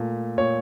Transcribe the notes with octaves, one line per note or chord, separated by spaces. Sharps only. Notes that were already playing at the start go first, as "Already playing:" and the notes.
Already playing: A#2 A3
A#2 C#5